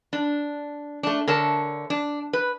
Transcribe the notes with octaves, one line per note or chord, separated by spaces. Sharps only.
D4
A3 D4
D3 A#4 C#5 A5
D4
B4